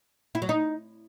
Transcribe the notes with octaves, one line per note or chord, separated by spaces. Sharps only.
E4
F#3
D#4